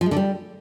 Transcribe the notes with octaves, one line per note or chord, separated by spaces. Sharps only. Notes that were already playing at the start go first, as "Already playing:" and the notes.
F3
G#3
D3
G3